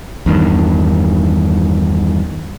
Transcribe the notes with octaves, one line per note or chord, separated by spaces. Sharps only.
E2 G2 D#3